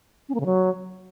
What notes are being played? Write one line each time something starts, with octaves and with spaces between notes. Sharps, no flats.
C#4
A#3
C#3
F#3